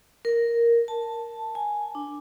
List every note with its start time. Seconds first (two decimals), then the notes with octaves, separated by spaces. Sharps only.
0.25 A#4
0.88 A5
1.55 G#5
1.95 D4